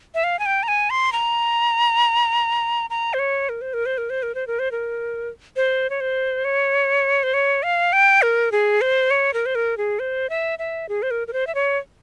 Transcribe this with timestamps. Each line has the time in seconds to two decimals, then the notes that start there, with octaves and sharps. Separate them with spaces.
0.15 E5
0.24 F5
0.39 G#5
0.46 G5
0.63 A#5
0.68 G#5
0.90 C6
1.13 A#5
2.90 A#5
3.14 C5
3.19 C#5
3.49 A#4
3.61 C5
3.74 A#4
3.86 C5
3.98 A#4
4.10 C5
4.23 A#4
4.35 C5
4.47 A#4
4.59 C5
4.72 A#4
5.56 C5
5.90 C#5
6.00 C5
6.45 C#5
7.23 C5
7.34 C#5
7.63 F5
7.93 G5
8.22 A#4
8.52 G#4
8.81 C5
9.11 C#5
9.34 A#4
9.46 C5
9.55 A#4
9.77 G#4
9.99 C5
10.30 E5
10.59 E5
10.89 G#4
11.03 C5
11.11 A#4
11.28 A#4
11.33 C5
11.47 E5
11.55 C#5